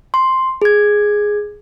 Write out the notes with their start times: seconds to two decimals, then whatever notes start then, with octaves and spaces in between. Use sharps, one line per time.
0.14 C6
0.62 G#4 G#6